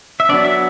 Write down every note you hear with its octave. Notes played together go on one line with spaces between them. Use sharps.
E5
F#3 B3 D4 D5
E5